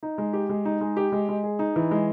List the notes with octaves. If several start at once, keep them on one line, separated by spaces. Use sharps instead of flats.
D#4
G#3
G4
G#3
D#4
G#3
G4
G#3
G#3
G#4
D#4
E3
G#3